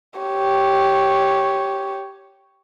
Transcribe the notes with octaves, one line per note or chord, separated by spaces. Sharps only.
G4 C#5